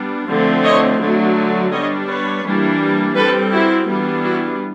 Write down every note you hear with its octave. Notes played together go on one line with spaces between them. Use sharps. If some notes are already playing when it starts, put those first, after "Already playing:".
Already playing: G3 B3 D4
D3 F3 A3 C4
C#5 D#5
D3 F#3 A3
G3 B3 D4 C#5 D#5
B4 C#5
E3 G3 A#3 D4
G3 C4 A4 B4
E4 F#4
E3 G3 B3 D4
E4 F#4